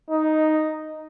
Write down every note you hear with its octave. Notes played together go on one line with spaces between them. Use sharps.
D#4